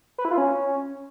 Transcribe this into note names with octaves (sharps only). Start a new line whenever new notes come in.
B4
E4
F4
C#4